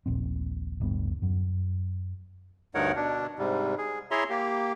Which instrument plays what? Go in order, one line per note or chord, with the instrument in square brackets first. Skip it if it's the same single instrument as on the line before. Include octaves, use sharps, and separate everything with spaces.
[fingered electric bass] D#1 A#1 C4
D1 G1 G2 B3
F#2 F#3
[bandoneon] D2 G2 D#4 A#4 C#5 F#5
B2 D4
G#2 C3 G3
G#4
E4 G#4 C#5 E5 A#5 C6
A#3 G4